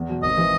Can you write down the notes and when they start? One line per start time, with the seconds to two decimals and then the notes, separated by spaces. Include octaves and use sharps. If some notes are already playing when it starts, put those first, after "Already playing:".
Already playing: E2
0.09 B2 F#3
0.23 G#1 D#5
0.37 E3